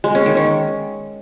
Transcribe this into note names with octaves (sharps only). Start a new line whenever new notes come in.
G#3
C#4
D#3
C#4